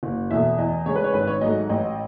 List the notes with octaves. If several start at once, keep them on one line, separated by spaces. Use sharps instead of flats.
F#1
E2 B2 A3 E5
E2 D#5
C#3 G#3 C#5
B4
C#5
G#1 B4
C#5
G#2 F#3 A3 D#5
A1 D#5